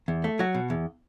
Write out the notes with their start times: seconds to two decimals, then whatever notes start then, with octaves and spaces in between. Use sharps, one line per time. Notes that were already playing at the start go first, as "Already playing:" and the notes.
0.08 E2
0.24 A3
0.39 F#3 F#4
0.54 B2
0.70 E2